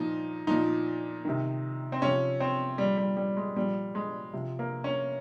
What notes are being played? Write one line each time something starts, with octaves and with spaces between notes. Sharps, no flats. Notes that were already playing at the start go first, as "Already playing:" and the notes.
Already playing: A#2 F3 D#4
A#2 F3 D#4
C3 D#3
C4
C3 F3 C#4
C4
A#2 F3 G3
G3
G3
G#3
A#2 F3 G3
G#3
C3 F3
A#3
C#4